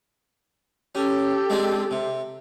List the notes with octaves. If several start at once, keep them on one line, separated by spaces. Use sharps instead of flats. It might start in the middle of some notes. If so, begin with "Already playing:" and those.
C#4 G4 A4
G#3 C4 D4
C3